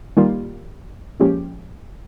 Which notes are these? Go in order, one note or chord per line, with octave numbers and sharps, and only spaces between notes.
D#3 G3 A#3 F4
A#2 F3 G#3 C#4 G4